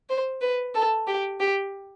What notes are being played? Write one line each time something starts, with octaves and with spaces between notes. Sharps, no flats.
C5
B4
A4
G4
G4